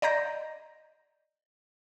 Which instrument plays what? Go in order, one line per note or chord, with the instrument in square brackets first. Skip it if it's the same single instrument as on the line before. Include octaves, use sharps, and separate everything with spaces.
[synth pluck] D5 D#5 A#5 G6 A#6